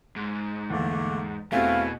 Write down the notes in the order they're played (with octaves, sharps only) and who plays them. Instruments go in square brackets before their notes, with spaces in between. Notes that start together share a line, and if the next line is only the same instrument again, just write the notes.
[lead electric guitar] G#2
[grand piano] E2 [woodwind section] D3 A3 A#3
[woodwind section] E2 E4 G#5 [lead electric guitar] B2 [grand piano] A3 C4 F#4 [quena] F5